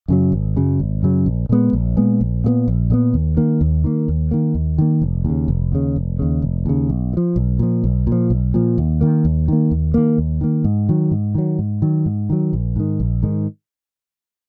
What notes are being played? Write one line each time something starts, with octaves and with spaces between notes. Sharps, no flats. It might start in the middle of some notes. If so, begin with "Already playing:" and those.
F#2 C#3 F#3
G#1
F#2 C#3 F#3
G#1
F#2 C#3 F#3
A#1
A#2 G#3 B3
A#1
A#2 G#3 B3
A#1
A#2 G#3 B3
A#1
A#2 G#3 B3
D#2
D#3 A#3
D#2
D#3 A#3
D#2
D#3 A#3
D#2
D#3 A#3
F1
D#2 C#3
F1
D#2 C#3
F1
D#2 C#3
F1
D#2 C#3
B1
A#2
F3
B1
A#2 F3
B1
A#2
F3
B1
A#2 F3
D#2
D#3 A#3
D#2
D#3 A#3
D#2
D#3 A#3
D#2
D#3 A#3
G#2
D#3 F#3
G#2
D#3 F#3
G#2
D#3 F#3
G#2
D#3 F#3
A#1
G#2 D#3
A#1
G#2 D#3